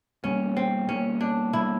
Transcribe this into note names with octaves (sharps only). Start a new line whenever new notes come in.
B2 G3 A#3 C#4
C4
B2 G3 A#3 C#4
D4
B2 G3 A#3 E4